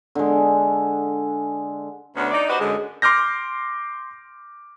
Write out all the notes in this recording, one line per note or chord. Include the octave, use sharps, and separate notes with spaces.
D3 G#3
D2 B3 C#4 D4
D#4 D5
F#4 G4 B4 C5 D#5
F#2 D3 G#3
C6 D6 F6 G6 A#6